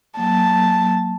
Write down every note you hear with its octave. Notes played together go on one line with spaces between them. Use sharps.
F#3 A#3 A5